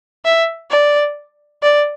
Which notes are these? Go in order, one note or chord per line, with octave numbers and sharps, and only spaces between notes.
E5
D5
D5